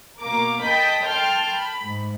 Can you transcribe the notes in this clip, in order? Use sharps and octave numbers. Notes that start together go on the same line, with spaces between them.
B2 A#3 A#4 D6
D#5 G5 A5 B5 G6 B6
A4 G5 A5 C6 F6 G6
B5
G#2